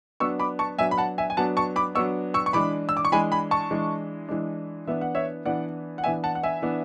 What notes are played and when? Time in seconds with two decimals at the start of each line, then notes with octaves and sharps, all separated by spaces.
0.20 F#3 B3 D4 C#6 E6
0.39 B5 D6
0.59 A5 C#6
0.78 F#3 B3 D4 E5 G#5
0.91 B5
0.98 F#5 A5
1.18 E5 G#5
1.30 G#5
1.37 F#3 B3 D4 F#5 A5
1.57 A5 C#6
1.76 B5 D6
1.95 F#3 B3 D4 C#6 E6
2.34 C#6 E6
2.46 C#6
2.53 E3 G#3 D4 B5 D6
2.89 E6
2.97 D6
3.05 C#6
3.12 E3 G#3 D4 G#5 B5
3.32 G#5 B5
3.51 A5 C#6
3.71 E3 G#3 D4
4.29 E3 G#3 D4
4.87 E3 B3 D4 E5
5.01 F#5
5.15 C#5 E5
5.45 E3 B3 D4 D5 F#5
5.98 F#5
6.04 E3 B3 D4 E5 G#5
6.24 F#5 A5
6.35 F#5
6.43 E5 G#5
6.62 E3 B3 D4